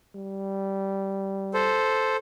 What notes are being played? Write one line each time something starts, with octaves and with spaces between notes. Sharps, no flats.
G3
A4 C5